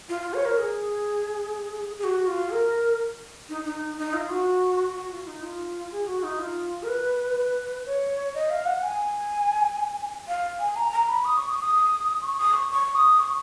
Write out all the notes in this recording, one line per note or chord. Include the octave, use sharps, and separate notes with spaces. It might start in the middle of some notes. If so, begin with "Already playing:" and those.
F4
F4
C#5
A#4
G#4
G#4
F#4
F4
A#4
D#4
D#4
D#4
F4
F#4
F#4
F4
D#4
F4
G#4
F#4
D#4
F4
A#4
B4
B4
C#5
D#5
F5
F#5
G#5
F5
G#5
A#5
A#5
B5
D#6
C#6
D#6
D#6
C#6
D#6
C#6
C#6
D#6
C#6